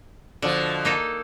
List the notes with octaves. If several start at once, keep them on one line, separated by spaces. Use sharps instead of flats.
B2 D3 F3
A#3 D#4 A4